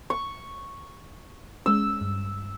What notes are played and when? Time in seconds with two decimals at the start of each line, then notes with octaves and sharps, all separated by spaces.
0.10 C#6
1.66 G#3 C#4 E6
2.01 G2